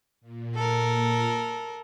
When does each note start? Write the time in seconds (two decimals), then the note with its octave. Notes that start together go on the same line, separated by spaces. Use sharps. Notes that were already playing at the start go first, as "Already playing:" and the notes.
0.21 A#2
0.55 A4 A#4